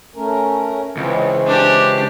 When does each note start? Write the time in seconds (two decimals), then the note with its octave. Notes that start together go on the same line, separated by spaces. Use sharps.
0.16 A3 C#4 A#4
0.97 C#2 E3 C4
1.47 D4 G4